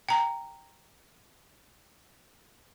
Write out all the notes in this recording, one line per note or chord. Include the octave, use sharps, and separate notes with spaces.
G5 A#5